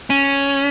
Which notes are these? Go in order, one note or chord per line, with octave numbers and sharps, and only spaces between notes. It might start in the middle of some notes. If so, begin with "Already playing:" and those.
C#4